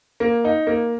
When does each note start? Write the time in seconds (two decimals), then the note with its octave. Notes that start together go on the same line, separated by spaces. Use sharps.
0.20 A#3
0.45 D#4
0.67 A#3